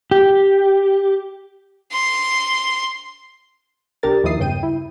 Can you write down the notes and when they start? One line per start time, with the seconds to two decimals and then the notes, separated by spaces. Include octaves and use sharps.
0.11 G4
1.92 C6
4.03 C2 D4 G4 A#4 A6
4.24 D#2 D#3 F3 E4 D#6 C7
4.39 E2 G2 C#3 G5 D#7
4.63 E4